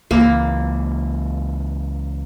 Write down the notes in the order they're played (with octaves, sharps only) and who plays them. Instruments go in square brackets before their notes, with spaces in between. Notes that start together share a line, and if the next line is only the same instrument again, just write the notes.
[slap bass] C#2 E3 [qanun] A#3